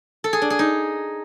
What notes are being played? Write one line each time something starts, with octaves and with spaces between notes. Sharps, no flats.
A4
G#4
D4
G#4
D#4